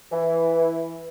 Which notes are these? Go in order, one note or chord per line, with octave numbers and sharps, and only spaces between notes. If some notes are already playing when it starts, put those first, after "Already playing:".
E3